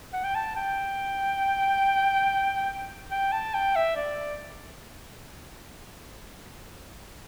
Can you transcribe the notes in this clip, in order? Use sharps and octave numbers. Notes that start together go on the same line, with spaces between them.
F#5
G5
A5
G5
G5
A5
G5
E5
D5